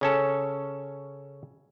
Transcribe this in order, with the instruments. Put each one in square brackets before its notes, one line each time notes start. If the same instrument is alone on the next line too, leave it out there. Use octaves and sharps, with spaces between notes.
[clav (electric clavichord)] C#3 C#4 A4